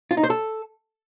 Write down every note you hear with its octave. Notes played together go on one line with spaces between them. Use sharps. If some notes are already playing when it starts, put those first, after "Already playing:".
F4
D#4
C5
A4